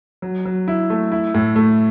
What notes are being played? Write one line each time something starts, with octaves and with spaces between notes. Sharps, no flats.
F#3
F#3
E4
A3
E4
A2
A3